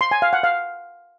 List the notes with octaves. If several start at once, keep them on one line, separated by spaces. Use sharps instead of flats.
C6
G#5
F5
F#5
F5